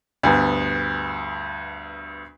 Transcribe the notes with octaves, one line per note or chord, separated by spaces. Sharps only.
D2 G2 B3